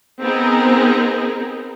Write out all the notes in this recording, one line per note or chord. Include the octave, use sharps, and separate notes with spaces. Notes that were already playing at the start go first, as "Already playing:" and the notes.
B3 C4 D#4 G#4 A#4